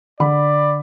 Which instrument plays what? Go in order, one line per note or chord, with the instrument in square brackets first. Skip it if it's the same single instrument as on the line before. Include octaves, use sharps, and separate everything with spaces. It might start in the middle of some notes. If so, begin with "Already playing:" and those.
[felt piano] D3 B5 [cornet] D5